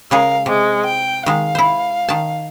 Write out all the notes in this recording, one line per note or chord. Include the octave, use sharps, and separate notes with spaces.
C#3 G#3 G#4 A#4 F5
C3 G#3
G5
D#3 G#3 F5
E4 C5
D#3 A5